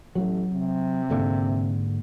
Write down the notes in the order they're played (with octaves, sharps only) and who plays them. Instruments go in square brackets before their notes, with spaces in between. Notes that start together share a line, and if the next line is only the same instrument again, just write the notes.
[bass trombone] A1 [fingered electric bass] F#3
[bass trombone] C3
[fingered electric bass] G#2 D3 A#3